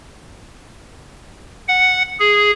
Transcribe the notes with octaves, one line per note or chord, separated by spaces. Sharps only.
F#5
G#4